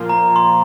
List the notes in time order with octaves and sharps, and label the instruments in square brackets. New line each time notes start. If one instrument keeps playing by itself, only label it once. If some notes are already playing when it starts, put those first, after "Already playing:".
Already playing: [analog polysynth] A#2 F3 A#3 F4
[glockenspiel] A#5
C6